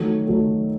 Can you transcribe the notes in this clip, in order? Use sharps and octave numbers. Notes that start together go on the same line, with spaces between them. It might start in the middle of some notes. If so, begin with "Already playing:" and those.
Already playing: D#3 F#3 A3
D#3 F#3 A3